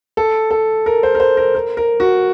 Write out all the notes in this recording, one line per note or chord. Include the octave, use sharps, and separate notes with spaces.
A4
A4
A#4
C5
A#4
C5
A#4
A#4
A#4
F#4